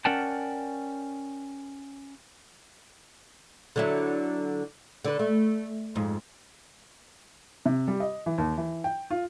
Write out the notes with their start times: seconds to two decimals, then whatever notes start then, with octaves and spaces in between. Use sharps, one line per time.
0.05 C#4 A#4 D5 F#5 G5 A5
3.76 D3 F#3 E4
5.05 D3 B4
5.19 A3
5.95 F2 G#2
7.66 C3
7.88 G3
8.00 D#5
8.26 E3
8.38 D#2
8.58 E3
8.84 G5
9.11 F4